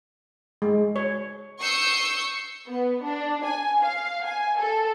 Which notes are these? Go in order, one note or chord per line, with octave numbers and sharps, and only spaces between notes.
G#3
C#5
C#6 D#6 E6 G6 C7 C#7
B3
D4
G#5
F5
G#5
A4